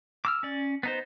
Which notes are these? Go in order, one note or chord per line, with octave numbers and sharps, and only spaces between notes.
D6 E6 F6
C#4 D5
B3 D#4 C5